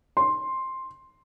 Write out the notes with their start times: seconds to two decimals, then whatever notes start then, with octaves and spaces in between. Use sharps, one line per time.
0.17 C6